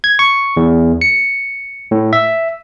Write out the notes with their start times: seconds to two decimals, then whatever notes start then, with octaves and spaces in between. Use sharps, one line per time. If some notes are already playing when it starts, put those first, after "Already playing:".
0.04 G#6
0.19 C#6
0.57 E2
1.01 C#7
1.91 A2
2.13 E5